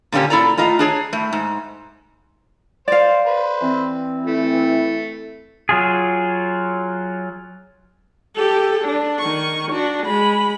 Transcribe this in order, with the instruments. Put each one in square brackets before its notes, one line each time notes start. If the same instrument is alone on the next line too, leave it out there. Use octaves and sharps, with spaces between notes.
[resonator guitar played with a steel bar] A#2 D3 A#3 C#4 G4
A#2 E4 A4 D5 A#5
A2 F4 D#5 A#5
D4 G#4 C#5
A2 A3
G#2
[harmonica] C5 [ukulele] D5 F5
[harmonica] B4 C5
[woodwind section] E3 C4
[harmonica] A3 [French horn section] E4
[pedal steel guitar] F#3 F4 G#4
[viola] G4 A4
D4
D#3 C#6
D4 F#4
G#3 B5